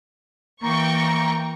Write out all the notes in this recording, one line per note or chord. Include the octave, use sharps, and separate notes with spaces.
E3 A#3 G5 A#5 C#6